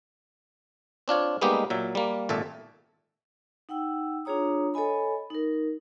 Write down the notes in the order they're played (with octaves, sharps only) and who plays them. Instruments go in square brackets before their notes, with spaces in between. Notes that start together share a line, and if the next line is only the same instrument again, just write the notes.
[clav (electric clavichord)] C4 D4 F4 C#5
G3 G#3 A#3 B3 D#4 G4
A#2 F#3 E5
G3 A#3
G#1 A#2 A4 E5
[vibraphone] D#4 F#5 G5 E6
D4 F4 G#4 C#5 A#5 D#6
A4 C#5 D#5 G#5 B5
D#4 A#4